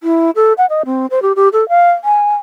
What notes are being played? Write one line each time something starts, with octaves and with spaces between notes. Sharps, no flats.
E4
A4
F#5
D#5
C4
C5
G4
G4
A4
F5
G#5